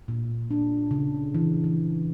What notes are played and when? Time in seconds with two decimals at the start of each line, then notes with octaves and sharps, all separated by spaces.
0.08 A#2
0.51 D4
0.91 C#3
1.35 E3
1.64 E3